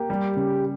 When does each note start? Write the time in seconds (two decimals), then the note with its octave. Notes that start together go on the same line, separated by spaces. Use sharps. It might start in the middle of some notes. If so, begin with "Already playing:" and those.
Already playing: A#3 G4
0.10 G3
0.36 C#3